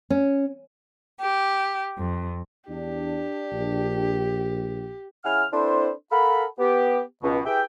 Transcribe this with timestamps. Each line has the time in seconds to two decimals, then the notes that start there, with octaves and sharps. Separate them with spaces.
0.10 C#4
1.20 G4
1.98 F2
2.69 E2 D4 G4
3.52 A#1
5.24 C#3 E4 F#5 G#5 F6
5.52 C4 D4 E4 A4 B4 C5
6.12 A4 A#4 F5 F#5 B5
6.58 B3 G4
7.23 C#2 B2
7.45 E4 G4 G#4 B4 E5 G5